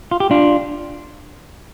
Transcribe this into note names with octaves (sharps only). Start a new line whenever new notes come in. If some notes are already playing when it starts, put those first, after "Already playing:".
F4
G4
D4 F4